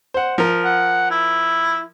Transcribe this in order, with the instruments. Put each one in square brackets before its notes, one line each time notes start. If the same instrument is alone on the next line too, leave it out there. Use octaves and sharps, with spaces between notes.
[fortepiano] C5 F#5
F3 A#4
[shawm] F#5
E4